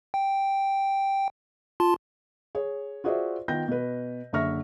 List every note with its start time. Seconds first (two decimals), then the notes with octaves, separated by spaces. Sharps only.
0.14 G5
1.80 F4 A5 C6
2.55 G#4 C#5
3.04 F4 F#4 G#4 C5 D5 E5
3.48 D#3 B3 F4 G5 G6 A#6
3.68 B2 B4
4.33 F#1 D3 E5 C#6 F6 A#6